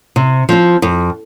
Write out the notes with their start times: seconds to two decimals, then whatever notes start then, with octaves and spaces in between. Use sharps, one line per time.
0.16 C3
0.49 F3 C4
0.82 F2